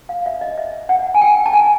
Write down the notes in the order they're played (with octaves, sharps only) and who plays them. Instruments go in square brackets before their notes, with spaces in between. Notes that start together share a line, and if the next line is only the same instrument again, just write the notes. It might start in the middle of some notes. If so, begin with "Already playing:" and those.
[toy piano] F5
E5
D#5
E5
F#5
G#5
G5
A5
G#5